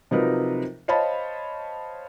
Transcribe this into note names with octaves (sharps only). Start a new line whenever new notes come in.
C3 F3 F#3 D#4 A#4 B4
C5 C#5 D#5 F5 A5 B5